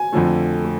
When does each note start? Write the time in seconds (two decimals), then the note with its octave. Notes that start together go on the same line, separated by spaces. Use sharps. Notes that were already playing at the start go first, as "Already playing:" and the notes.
Already playing: G#5
0.12 F2 D3 F3 A3
0.65 A3